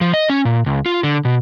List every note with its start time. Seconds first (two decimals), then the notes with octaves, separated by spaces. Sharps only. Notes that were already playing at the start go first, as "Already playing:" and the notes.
0.01 F3
0.14 D#5
0.30 C#4
0.45 A#2
0.66 C#2
0.86 F4
1.03 D3
1.25 B2